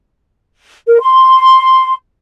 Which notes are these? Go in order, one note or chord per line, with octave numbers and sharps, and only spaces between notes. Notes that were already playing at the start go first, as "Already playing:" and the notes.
A#4
C6